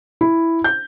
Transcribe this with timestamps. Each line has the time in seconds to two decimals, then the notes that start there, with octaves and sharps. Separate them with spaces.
0.21 E4
0.64 G6